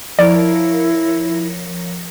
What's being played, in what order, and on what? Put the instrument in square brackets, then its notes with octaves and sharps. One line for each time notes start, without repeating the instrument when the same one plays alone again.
[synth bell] F3 A#4 C#5 [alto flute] E4 [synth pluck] D5